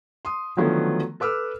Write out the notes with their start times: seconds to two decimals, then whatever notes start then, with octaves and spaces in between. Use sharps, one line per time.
0.25 C6 D#6
0.57 D3 D#3 F3 F#3 A3 B3
1.20 A4 B4 D6 E6 F6